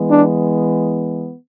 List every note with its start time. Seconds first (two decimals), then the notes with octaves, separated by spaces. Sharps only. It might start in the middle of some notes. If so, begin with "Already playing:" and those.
Already playing: E3 G#3 B3
0.10 D4